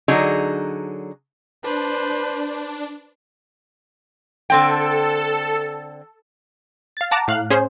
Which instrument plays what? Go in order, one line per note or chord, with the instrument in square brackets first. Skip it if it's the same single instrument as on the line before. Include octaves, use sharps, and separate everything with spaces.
[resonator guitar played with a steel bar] D3 F#3 D#4 G#4
[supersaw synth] D4 [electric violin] B4 C5
[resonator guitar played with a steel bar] D3 C4 G5 [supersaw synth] A4
[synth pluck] F5 A6
F#5 A5 A#5 D6
A2 F5 F#6
C#4 G#4 C5